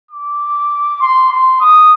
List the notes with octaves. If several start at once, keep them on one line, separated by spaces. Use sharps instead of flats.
D6
C6
C6
D#6